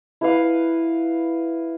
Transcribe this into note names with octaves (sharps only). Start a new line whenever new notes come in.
E4 B4 F5